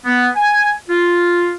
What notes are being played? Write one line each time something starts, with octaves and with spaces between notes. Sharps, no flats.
B3
G#5
F4